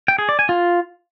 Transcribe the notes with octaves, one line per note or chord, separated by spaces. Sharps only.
G5
G#4
D5
G#5
F4